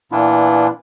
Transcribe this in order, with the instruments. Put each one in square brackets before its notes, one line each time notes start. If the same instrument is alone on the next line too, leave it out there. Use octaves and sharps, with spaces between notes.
[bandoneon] A#2 E3 B3 D4 E4 F4